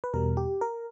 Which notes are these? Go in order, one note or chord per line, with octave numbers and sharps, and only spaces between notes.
B4
E2 B2 G3 A#4
G4
A#4